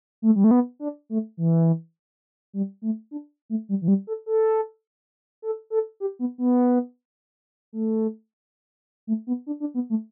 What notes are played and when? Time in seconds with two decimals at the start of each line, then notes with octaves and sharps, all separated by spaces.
0.22 A3
0.36 G3
0.44 A3
0.51 B3
0.80 D4
1.09 A3
1.37 E3
2.53 G3
2.82 A3
3.11 D4
3.49 A3
3.69 G3
3.82 E3
3.88 G3
4.07 A4
4.26 A4
5.42 A4
5.70 A4
6.00 G4
6.19 B3
6.38 B3
7.73 A3
9.07 A3
9.27 B3
9.47 D4
9.60 D4
9.74 B3
9.90 A3